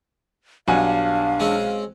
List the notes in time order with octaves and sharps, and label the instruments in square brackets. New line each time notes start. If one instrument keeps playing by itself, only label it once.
[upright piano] B1 F#5 G#5 [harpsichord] G2 [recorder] D4 [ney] F5
[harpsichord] G#3 C4 C#4